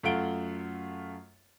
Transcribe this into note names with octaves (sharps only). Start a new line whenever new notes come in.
F#2 A3 F4 F#5 D7 G7